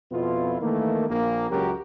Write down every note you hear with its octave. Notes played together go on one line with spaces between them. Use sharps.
F2 B2 B3 E4 F4
D#3 E3 A3 A#3
A#1 A#3
C#2 F#2 F#3 F#4 G4 A#4